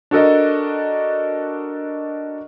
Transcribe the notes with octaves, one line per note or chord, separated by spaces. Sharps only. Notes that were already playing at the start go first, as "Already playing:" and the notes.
D4 F#4 A4 A#4 D#5